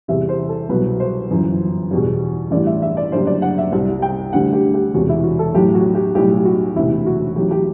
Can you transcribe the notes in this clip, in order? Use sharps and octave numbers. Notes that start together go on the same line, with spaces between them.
E2 C3 E3 G3 E5
C5
A4
C2 B2 F#3 B4
C5
G1 F#2 E3
E2 B2 G3
A1 G2 E3 G3 D5
E5
E5
D5
F#1 F#2 D3 G3 C5
D5
F#5
E5
C2 C3 G3
G5
D2 D3 G3 F#5
G4
G4
E1 E2 C3 F#4
E4
F#4
A4
B1 A2 F#3 G4
F#4
G4
B1 A2 G3 G4
F#4
E1 D2 C3 E4
F#4
A1 A2 F#3 G4
G4